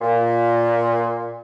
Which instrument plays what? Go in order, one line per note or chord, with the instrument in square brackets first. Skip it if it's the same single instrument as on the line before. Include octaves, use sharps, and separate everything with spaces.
[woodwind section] A#2